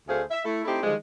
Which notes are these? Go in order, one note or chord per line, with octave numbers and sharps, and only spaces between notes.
D2 D3 A3 G#4 C5 F5
E5
A3 E4
A3 C4 D#4 E4 G4
D3 D#3 F3 G3 G#3